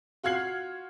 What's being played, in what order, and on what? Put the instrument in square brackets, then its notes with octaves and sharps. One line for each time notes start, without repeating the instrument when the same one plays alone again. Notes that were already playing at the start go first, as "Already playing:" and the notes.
[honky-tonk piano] F4 F#4 F6 G#6 C7 F#7